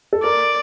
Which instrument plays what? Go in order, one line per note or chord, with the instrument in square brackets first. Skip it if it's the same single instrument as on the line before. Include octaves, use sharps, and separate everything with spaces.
[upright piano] A4
[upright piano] A#4 [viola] D5